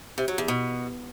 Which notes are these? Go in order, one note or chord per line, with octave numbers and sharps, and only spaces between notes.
C3
F#3
E2
B2